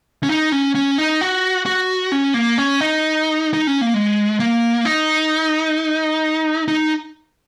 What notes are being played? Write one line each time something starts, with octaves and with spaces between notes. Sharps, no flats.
C#4
D#4
C#4
C#4
D#4
F#4
F#4
C#4
A#3
C#4
D#4
D#4
C#4
A#3
G#3
A#3
D#4
D#4